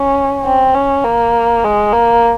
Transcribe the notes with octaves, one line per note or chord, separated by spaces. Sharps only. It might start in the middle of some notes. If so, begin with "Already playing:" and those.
Already playing: C#4
C4
C#4
A#3
G#3
A#3